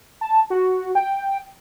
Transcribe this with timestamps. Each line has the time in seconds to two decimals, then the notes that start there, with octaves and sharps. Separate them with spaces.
0.21 A5
0.50 F#4
0.95 G5